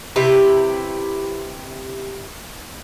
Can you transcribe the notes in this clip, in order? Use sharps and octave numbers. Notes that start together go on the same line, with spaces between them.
C3 E4 G4 B4